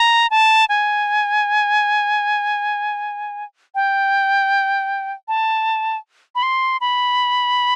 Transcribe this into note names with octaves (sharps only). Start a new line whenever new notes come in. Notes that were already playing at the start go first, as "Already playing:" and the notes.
Already playing: A#5
A5
G#5
G5
A5
B5
C6
B5